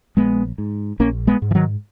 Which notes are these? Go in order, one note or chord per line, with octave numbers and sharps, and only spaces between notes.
A#1 G#3 B3
G#2
A#1 A#3 C#4
G#3 B3
G#2
E3
D#3 F#3